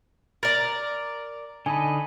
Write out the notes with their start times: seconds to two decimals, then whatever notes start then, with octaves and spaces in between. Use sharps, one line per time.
0.43 A#4 D5 A6
1.66 D3 D#4 D#5 G#5 A5 B5